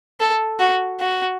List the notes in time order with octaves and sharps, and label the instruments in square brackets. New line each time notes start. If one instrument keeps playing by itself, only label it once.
[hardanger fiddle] A4
F#4
F#4